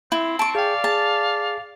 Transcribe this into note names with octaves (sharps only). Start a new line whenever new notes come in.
C4 E4
A5 C#6 D7
G#4 D5 F5 G5
G#4 A5